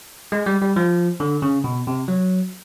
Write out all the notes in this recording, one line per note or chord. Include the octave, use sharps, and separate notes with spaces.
G#3
G3
G3
F3
D3
C#3
B2
C3
F#3